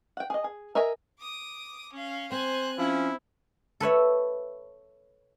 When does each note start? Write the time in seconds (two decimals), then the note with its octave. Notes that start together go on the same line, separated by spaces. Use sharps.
0.17 F#5 G5
0.30 G#4 D#5
0.44 G#4
0.75 A#4 D#5 E5 G#5 A#5
1.19 D6 D#6
1.93 C#4 F5
2.31 C4 C5 G#5 F#6
2.78 F3 C#4 E4
3.80 A4 B4 C#5 E5